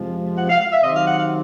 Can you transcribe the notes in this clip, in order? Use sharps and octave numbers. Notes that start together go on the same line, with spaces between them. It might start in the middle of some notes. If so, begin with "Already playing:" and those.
Already playing: F2 C3 F3 G#3
F#5
F5
F5
E5
C3 D#3 F#3 D#5
F5
F#5
F5